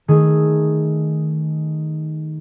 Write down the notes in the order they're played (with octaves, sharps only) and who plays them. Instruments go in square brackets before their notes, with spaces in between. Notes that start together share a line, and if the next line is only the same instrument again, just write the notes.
[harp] D#3 A3 G#4